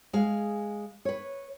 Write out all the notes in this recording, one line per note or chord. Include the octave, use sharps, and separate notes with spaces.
G#3 G#4 F5
B4 C#5